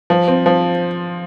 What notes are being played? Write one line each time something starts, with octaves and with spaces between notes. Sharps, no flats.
F3
C4
F3